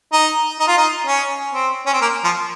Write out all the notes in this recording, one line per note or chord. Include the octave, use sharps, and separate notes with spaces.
D#4
D#4
F4
D#4
C#4
C4
C#4
C4
A#3
F3